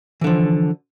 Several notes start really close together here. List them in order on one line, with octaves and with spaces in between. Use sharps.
E3 D3 F3